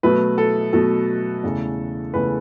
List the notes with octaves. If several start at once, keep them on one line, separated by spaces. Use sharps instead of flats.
B2 F#3 A3 B4
A4
B2 F#3 A3 A4
E2 C#3 A3
E2 C#3 A3 B4